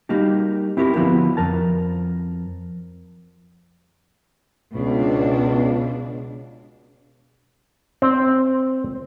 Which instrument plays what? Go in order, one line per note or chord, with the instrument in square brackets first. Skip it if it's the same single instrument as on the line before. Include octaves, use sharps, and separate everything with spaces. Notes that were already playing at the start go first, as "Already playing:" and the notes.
[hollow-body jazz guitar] G3 A#3 D#4 F#4 G4
C4 E4 F#4 G4 A#4
D3 F3 B3 E4 F#4 B4
F2 F3 A#4 A5
[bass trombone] C#2 [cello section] B2 D4
[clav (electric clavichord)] C4